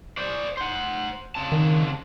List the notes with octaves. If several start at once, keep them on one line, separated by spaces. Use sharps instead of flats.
C5 D5
C5 F#5
C#3 C4 A5
D#3